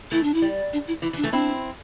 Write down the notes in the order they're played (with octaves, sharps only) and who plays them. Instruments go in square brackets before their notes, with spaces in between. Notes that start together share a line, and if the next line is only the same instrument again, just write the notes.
[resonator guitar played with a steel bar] E3 A3 [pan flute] E4
[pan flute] D4
E4
[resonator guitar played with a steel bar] G3
[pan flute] D4
E4
[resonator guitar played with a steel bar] E3 [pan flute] E4
[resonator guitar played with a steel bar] E3
[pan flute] D4
[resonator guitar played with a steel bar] E3 A3
[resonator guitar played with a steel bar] C4 E4 [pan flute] D4